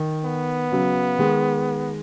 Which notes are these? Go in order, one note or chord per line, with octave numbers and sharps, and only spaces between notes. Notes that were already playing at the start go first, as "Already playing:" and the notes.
Already playing: D#3
B3
C#3 F#3
D#3 G#3